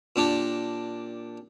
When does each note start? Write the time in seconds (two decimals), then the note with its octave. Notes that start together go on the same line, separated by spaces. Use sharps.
0.16 A#2 D4 G4